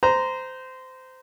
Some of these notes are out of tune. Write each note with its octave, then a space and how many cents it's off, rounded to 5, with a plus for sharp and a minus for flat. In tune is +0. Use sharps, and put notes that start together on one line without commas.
C5 -20 A#5 +0